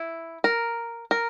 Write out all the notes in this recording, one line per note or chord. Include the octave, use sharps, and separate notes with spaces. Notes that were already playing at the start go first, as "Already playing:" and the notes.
Already playing: E4
A#4
A#4